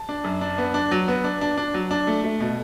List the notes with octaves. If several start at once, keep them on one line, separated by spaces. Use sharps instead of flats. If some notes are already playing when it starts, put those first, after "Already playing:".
Already playing: A5
D4
F#2
D4
B3
D4
F#3
B3
D4
D4
D4
F#3
D4
A3
A3
B2